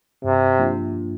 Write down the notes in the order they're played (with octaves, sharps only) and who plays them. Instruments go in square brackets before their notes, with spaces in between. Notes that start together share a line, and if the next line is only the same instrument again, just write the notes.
[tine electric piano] G2 [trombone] C3
[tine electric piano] F3 A#3 D4 F4